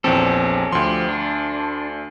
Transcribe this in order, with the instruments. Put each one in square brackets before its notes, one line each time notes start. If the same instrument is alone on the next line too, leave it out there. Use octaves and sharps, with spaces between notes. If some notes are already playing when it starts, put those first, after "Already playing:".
[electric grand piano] A#1 E2 C4 [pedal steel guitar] C#4 G4 A4
[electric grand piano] D2 C6 [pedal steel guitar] F3 G4
[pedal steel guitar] D4